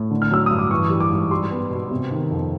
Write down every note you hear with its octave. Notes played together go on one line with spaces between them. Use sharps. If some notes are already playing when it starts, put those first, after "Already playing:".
Already playing: A2
D3
F6
F#3 E6
G2 D#6
D6
E3 C#6
G3
D6
G#2
G3 C6
B3
B2
C3
D#3
F2